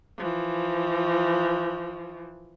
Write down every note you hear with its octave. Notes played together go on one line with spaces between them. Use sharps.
E3 F3